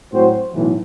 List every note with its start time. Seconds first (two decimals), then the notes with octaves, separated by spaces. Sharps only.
0.12 A2 F#3 C4 F#4 C5
0.54 B1 A2 E3